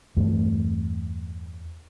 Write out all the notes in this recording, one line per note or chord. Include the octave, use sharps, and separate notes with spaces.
E2 G2 A3